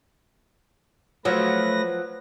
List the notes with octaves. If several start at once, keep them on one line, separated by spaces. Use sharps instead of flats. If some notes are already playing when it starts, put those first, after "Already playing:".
F3 F#3 A3 B4 A#6